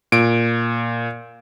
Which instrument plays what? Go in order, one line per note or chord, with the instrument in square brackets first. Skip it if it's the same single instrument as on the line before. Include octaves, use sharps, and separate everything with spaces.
[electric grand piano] A#2 D7